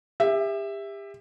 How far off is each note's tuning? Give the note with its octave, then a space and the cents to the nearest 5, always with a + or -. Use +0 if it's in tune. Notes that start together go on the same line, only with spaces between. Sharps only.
G4 +35 E5 +0